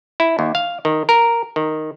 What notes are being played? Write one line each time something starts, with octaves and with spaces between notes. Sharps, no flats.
E4
D#2
F5
D#3
A#4
D#3